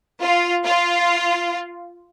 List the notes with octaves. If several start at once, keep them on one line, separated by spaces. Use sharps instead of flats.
F4
F4